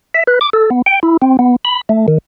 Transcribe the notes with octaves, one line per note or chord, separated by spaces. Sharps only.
E5
B4
D6
A4
B3
G5
E4
C4
B3
B5
A3
D#3